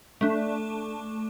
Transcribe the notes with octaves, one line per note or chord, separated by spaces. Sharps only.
A3 D4